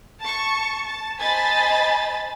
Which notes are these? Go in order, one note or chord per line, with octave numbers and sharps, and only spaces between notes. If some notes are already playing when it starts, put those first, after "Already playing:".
A5 C#6
A5
C5 D#5 G#5 A5 B5 A6